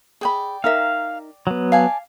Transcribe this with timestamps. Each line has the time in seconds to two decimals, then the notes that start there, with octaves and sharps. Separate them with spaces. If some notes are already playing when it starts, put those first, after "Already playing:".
0.21 G#4 D5 G5 B5
0.64 D#4 A#4 E5 F5
1.47 F#3 B3
1.72 D5 F5 G#5 A5